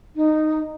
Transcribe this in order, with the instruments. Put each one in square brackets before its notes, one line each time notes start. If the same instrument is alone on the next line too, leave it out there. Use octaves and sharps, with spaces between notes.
[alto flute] D#4